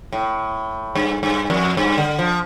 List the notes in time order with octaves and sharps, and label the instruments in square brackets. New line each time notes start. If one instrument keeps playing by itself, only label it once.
[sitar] A2
G2
G2
F2
G2
D3
F3